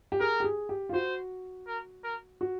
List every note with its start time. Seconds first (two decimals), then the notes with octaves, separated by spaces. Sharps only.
0.12 G4
0.20 G#4 A#4
0.40 G4
0.44 G#4
0.69 G4
0.89 F4
0.93 F#4 C5
1.67 A#4
2.04 A#4
2.41 F#4